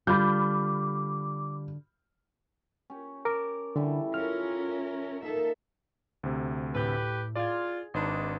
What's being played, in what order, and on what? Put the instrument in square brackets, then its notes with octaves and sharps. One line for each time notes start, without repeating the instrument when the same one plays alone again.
[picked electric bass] D3 [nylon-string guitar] G3 F4 [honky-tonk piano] B5 F6 G6 [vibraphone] D6
[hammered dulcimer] C#4 G4
[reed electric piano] A#4 D6 [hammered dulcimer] A5
[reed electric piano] D3 [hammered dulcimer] E3 G3 A4
[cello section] C#4 A#4 [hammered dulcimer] F4 [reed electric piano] F6
[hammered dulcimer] E5
[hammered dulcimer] A#3 [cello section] D#4 A4 E5
[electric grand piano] D2 C3
[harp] A2 A3 [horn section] G4 B4
[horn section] F4 [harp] G#4 G#6 [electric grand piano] D5
[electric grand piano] G#1 [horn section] D4 D#4 [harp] B4 C6